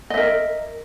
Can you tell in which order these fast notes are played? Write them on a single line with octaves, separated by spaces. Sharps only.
D#5 E5 A#4